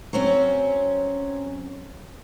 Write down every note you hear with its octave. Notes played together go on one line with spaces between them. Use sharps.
F#3 C4 C#4